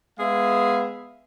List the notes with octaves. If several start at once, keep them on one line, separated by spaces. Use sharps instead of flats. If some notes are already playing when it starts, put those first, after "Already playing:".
G#3 B3 G#4 E5 F5